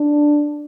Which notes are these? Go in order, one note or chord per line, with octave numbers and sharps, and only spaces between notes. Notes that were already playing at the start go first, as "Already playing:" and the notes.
Already playing: D4